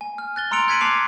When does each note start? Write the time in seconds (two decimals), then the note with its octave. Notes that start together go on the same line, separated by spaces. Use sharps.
0.01 G#5
0.18 F6
0.36 F#6 A6 G7
0.51 A#5 C6 E6 C#7 D7 F7
0.68 F#6 G#6 B6 D7 D#7 F#7
0.80 A5 D6 C7 F7